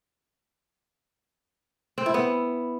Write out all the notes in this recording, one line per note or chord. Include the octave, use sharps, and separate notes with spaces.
C4
E4
B3